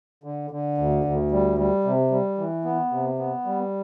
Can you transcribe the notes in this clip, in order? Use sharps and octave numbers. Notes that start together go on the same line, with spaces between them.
D3
D3
D2
D2
G3
G3
C3
G3
E3
B3
C3
B3
G3